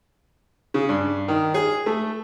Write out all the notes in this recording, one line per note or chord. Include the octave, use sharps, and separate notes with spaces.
C#3
G2
D#3
G#4
A3